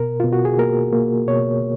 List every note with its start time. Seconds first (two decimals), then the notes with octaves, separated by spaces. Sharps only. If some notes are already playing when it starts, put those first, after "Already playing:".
Already playing: B2 A#4
0.20 B2 F4
0.33 F#4
0.45 G#4
0.58 A#3 A#4
0.93 A#3
1.27 B2 C#5